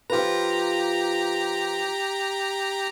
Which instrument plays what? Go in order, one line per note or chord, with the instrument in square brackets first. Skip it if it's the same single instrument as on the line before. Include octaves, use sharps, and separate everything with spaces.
[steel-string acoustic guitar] F3 F4 B4 [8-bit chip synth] G4 A#5